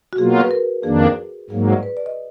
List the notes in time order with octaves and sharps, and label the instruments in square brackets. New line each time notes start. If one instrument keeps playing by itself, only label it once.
[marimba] F#4
[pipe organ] B2 F#3 A#3 F4 [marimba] G#4
[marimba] B4
A#4
[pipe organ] F2 D#3 A#3 D4 [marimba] G#4
[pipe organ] G#2 F#3 A#3 [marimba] G#4
[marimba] D5
B4
D5
D#5